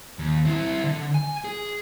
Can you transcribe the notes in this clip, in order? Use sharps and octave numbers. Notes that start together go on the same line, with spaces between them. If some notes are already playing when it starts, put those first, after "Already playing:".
D#2
C4 E4
D3
G#5
G#4